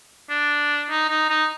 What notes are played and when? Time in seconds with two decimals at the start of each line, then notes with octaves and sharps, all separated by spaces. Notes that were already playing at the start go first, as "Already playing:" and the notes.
0.30 D4
0.90 D#4
1.10 D#4
1.30 D#4